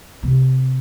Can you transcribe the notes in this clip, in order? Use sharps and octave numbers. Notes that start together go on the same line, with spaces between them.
C3